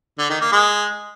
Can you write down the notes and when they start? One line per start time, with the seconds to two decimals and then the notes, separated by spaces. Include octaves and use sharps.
0.19 D3
0.30 D#3
0.41 A#3
0.52 G#3